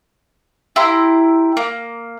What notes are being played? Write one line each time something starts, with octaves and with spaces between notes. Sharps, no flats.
E4 G4 A#5 C6
A#3